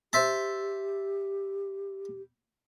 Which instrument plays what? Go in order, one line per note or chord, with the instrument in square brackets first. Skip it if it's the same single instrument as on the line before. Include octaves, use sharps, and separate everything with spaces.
[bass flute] G4 [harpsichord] C5 E5 A5